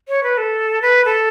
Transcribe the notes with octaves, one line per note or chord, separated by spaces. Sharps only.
C#5
B4
A4
B4
A4